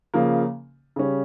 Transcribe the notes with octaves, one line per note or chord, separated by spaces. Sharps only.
C#3 F3 A#3
C#3 G3 C#4